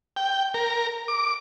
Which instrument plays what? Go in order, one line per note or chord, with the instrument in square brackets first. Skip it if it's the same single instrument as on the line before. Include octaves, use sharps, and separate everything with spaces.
[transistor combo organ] G5
A#4
D6